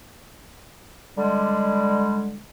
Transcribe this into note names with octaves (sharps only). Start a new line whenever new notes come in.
D3 G3 G#3